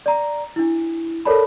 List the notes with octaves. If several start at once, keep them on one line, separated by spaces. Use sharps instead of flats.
D5 A#5
D4 E4
A4 A#4 C#5 D5 A5 B5